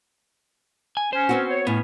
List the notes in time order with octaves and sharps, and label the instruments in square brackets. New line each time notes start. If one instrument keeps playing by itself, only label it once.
[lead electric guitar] G#5
[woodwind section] C#4 [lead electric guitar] C5
[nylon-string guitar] B3 C4 F#4
[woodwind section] C#5
[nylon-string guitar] A2 [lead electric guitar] B3 [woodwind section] C#4